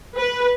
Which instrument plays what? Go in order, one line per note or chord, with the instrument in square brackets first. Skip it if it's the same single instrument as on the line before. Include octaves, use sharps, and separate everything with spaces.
[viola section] B4